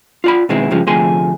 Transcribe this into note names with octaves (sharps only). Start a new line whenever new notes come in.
F4 D5 B5
B2 D#3 G#3 C4 E4
G2 C#3 F3 G#3
D2 C3 F3 A3 G#4 C6